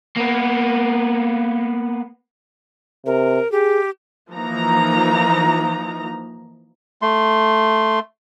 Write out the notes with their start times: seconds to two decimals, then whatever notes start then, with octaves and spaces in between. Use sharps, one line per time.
0.17 A#3 B3
3.06 C3 A#4
3.52 G4 G#4
4.31 E3 F3 A#3 D#4 A#5
7.02 A3 C6